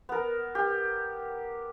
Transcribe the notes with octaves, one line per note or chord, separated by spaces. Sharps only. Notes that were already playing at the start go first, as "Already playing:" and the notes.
B3 A#4
G4